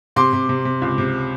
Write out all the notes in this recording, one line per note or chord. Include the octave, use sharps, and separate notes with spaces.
C3 C6 D6
C3
C3
C3
C#2
C3